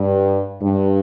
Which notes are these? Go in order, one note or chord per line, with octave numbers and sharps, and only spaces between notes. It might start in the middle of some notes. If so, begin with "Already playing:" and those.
Already playing: G2
G2